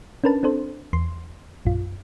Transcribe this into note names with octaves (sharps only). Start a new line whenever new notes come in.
C#4 D4 A#4 B4 A5
C4 D4 A4 C5
E2 C6
A#1 F#2 F4